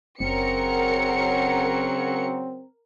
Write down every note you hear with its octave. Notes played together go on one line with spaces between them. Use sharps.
F#1 C#3 F#3 C4 A#4 C#7